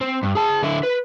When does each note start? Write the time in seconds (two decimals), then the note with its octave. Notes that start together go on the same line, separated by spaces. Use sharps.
0.01 C4
0.23 G2
0.35 G#4 A5
0.62 D3 E4
0.83 B4